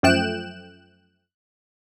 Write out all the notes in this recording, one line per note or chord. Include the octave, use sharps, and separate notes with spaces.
F#2 F3 A3 G5 F#6 E7